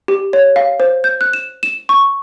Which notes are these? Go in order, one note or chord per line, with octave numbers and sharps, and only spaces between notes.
G4
C#5
F5
C5
G6
F#6
E7
E7
C#6